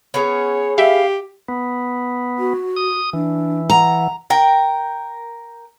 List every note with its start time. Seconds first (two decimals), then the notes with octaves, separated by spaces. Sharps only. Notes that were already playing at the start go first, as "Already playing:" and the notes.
0.14 B3 C#4 G#4 C#5
0.78 G4 E5 F5
1.48 B3
2.39 F#4
2.76 D#6
3.13 E3 D4
3.70 F#5 A#5
4.30 A#4 G5